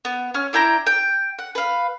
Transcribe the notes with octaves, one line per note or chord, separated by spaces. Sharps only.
B3
C#4 F6
D4 E4 G5 A#5
G5
F#5
B4 F5